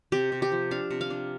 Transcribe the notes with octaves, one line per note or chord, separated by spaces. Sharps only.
C3 G4
C3
G4
F3
D4 F5
C3
F5
D4